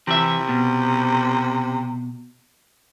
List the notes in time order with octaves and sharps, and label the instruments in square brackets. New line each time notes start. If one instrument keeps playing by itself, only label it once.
[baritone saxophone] C3 [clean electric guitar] E3 E5
[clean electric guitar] B2